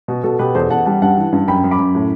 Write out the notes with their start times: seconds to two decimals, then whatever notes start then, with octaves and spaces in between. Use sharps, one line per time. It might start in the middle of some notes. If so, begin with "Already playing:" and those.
0.08 B2 F#4
0.23 B2 F#4 A4
0.39 B2 G4 B4
0.55 E2 A4 C5
0.70 E2 F#5 A5
0.85 G3 F#5 A5
1.02 G2 F#5 A5
1.17 E3
1.32 G2
1.48 F#2 G5 B5
1.64 F#2
1.71 B5 D6
1.79 F#2
1.95 A2